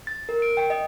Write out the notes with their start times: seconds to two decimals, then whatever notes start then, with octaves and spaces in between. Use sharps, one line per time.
0.07 A6
0.29 A#4
0.42 D7
0.57 G5
0.70 D#5